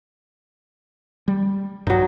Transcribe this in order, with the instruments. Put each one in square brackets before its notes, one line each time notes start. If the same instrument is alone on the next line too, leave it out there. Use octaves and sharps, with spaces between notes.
[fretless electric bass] G3
[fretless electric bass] A#1 G2 [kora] F#3 D#4